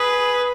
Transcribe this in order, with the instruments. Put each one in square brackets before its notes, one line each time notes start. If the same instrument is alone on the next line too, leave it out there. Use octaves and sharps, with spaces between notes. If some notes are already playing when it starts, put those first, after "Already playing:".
Already playing: [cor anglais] G#4 [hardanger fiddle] B4